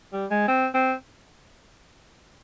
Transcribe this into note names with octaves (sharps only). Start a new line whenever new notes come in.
G3
G#3
C4
C4